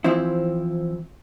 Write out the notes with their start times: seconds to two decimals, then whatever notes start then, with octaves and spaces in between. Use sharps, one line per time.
0.04 E3 F3 C4 E4